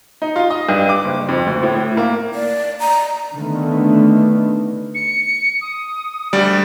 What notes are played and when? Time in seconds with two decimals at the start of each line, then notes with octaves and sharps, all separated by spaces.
0.22 D#4
0.36 F4
0.50 D#5
0.69 G2
0.89 D6
1.05 F#1
1.29 F2
1.46 D2
1.63 A2
1.75 A2
1.97 A#3
2.34 D5
2.80 A#5
3.35 D3 D#3 A3 B3
4.95 C#7
5.61 D#6
6.33 D2 G3 D5